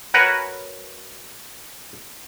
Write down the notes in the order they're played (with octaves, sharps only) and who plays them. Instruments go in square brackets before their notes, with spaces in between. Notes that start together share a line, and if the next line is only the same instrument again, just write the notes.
[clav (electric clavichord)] F#4 A#4 B4 C#5 F#5 G#5